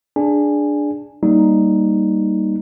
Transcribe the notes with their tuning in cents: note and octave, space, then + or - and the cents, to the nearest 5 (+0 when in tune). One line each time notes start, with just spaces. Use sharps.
D4 +0 G#4 +0 G#5 -15
G3 +0 A#3 +0 D#4 +0